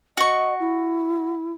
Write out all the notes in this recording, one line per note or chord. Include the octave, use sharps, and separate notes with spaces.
F#4 D#5 C#6
E4